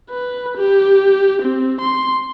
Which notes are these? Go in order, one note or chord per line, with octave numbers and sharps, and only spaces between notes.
B4
G4
C4
C6